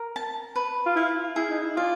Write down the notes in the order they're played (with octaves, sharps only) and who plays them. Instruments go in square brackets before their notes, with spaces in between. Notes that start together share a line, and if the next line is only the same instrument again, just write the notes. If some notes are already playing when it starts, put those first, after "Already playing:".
Already playing: [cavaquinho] A#4
A5
B4
[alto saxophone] F4
[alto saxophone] E4 [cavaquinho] F5
[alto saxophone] E4 [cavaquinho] G#4
[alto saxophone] D#4
E4
[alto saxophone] F4 [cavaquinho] D5